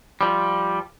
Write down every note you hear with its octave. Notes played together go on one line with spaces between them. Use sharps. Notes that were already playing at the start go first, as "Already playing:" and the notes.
F3 G3